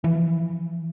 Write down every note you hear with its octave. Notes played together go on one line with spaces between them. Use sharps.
E3 F3